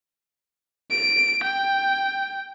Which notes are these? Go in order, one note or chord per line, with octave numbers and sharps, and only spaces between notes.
D7
G5